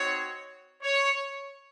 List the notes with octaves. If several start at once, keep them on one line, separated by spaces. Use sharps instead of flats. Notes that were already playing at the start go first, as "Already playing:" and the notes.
Already playing: C4 D#4 F#4 C#5
C#5